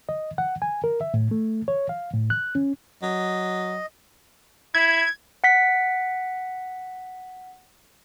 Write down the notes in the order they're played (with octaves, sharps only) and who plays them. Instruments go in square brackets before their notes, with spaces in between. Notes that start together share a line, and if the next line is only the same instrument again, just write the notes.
[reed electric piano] D#5
F#5
G#5
A#4
E5
A2
A3
C#5
F5
A2
F#6
C#4
[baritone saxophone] F#3 [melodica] D#5
[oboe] E4 [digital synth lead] G#6
[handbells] F#5 B6